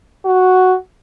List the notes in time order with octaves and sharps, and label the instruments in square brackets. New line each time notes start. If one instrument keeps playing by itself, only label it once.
[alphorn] F#4